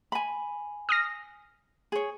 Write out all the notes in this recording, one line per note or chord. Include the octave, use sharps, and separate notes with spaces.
G#5 B5
D#6 F6 A#6
G#4 C#5